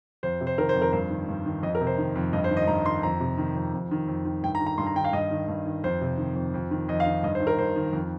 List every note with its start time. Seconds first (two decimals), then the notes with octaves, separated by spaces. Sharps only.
0.23 F2 C5
0.41 C3
0.47 C5
0.58 D#3 A#4
0.69 C5
0.76 F2
0.82 A#4
0.93 G2 C5
1.10 D#3
1.29 G2
1.46 D#3
1.63 F2 D#5
1.75 A#4
1.81 C3
1.87 C5
1.98 D#3
2.16 F2
2.33 G2 D#5
2.44 C5
2.51 D#3
2.57 D#5
2.68 G2 A#5
2.86 D#3 C6
3.03 F2 A#5
3.20 C3
3.38 D#3
3.55 F2
3.73 F2
3.91 D#3
4.08 F2
4.25 D#3
4.43 G2 G5
4.55 A#5
4.60 D#3
4.66 A#5
4.78 G2 C6
4.86 A#5
4.95 D#3 G5
5.04 F5
5.13 G2 D#5
5.31 D#3
5.48 G2
5.66 D#3
5.84 F2 C5
6.01 C3
6.18 D#3
6.35 F2
6.54 F2
6.71 D#3
6.89 F2 D#5
7.00 F5
7.07 D#3
7.23 G2 D#5
7.35 C5
7.40 D#3
7.47 A#4
7.58 G2 C5
7.76 D#3
7.93 F2